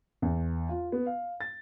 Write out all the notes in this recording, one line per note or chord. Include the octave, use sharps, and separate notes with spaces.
E2
F4
B3
F5
A6